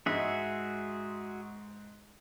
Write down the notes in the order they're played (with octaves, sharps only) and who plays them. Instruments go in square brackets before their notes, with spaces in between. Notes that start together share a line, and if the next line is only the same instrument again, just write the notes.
[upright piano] G#2 G#3 [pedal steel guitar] F#4 G#4 E5